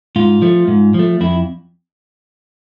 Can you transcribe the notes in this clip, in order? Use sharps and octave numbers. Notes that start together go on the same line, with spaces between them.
G#2 F4
F3 A3
G#2
F3 A3
F2 E4